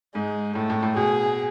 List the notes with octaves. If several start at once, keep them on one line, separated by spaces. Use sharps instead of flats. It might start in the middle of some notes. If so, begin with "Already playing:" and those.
G#2 G#3
A2 A3
A2
A2
B2 G#4